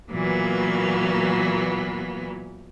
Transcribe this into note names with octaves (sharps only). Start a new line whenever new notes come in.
A#2 E3 F#3 A#3 B3